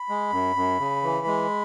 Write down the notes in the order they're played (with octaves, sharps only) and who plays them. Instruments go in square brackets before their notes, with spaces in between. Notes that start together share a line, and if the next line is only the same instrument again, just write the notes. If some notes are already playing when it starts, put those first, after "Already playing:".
Already playing: [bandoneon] B5
G#3
F#2
F#2
C#3
E3
G#3